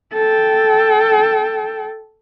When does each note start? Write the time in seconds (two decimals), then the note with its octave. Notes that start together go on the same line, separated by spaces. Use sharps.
0.13 A4 G5